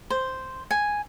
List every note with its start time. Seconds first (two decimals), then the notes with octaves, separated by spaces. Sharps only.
0.10 C5
0.71 G#5